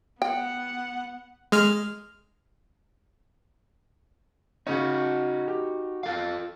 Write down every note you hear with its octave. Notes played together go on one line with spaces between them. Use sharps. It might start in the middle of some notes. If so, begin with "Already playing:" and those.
B3 F#5 G5
G#3 F6
C#3 C#4 D#4 F#4
G4
F4 A4 F5